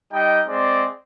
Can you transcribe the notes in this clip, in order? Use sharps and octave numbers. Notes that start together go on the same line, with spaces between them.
G3 D#4 D#5 G5
G#3 C4 D5